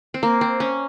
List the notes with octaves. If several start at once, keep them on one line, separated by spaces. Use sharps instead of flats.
C4
A#3
C4
C#4